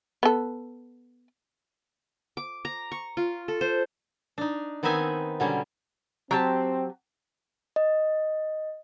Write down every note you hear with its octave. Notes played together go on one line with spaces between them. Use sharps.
B3 A4
D6
A#5
C#6
F4
A4
C5
D4 D#4
D#3 B3 C4 D#4 E5 G#5
B2 D3 F#3 G3 C#4
F#3 C4 G4 A5
D#5